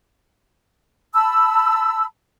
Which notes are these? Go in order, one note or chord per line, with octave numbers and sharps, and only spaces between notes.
A5 B5 E6